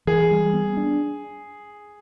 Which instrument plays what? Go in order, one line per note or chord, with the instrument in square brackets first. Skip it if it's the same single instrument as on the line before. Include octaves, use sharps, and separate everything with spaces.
[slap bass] E3 [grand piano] G#4
[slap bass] G3
B3
D4